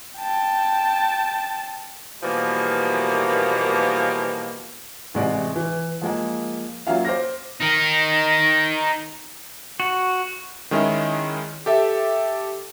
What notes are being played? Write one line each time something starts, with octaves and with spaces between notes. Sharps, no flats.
G5 A5
B2 E3 F3 G3 A#3
A1 C3 G#3 D5
E3
F3 G#3 A#3
F#3 A#3 C#4 F4 E5 F5
C5 D6 F6 A#6
D#4 A#4
F#4
D#3 G#3 C#4 E4
G4 A4 E5